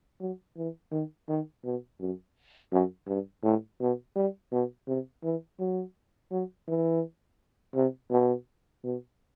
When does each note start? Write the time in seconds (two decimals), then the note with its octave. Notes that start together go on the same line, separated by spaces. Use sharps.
0.21 F#3
0.57 E3
0.92 D#3
1.29 D#3
1.64 B2
2.01 F#2
2.72 F#2
3.08 G2
3.44 A2
3.81 B2
4.16 G3
4.52 B2
4.88 C3
5.24 E3
5.60 F#3
6.31 F#3
6.68 E3
7.75 C3
8.11 B2
8.84 B2